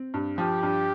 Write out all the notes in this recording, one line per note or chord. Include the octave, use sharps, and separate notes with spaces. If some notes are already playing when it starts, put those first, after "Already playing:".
Already playing: C4
G2
F3 G4
G2